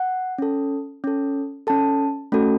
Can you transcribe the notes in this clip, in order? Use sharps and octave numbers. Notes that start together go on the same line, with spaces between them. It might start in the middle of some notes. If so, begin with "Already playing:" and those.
Already playing: F#5
C#4 A4
C#4 A4
C#4 A4 A5
A3 C#4 F#4 A4